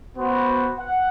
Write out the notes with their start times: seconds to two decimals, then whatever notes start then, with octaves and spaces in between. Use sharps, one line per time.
0.14 B3 F#4 C5
0.80 F#5